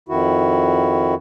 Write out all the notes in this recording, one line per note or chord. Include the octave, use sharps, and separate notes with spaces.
F2 D#3 E4 F#4